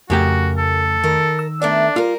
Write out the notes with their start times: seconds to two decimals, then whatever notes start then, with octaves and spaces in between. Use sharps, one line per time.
0.10 F2 C#3 A3 F#4 G4 A#4 G5
0.58 A4
1.04 D#3 A#4
1.39 E6
1.62 A3 B3 D4 A#4 D5
1.96 G3 F4 A#4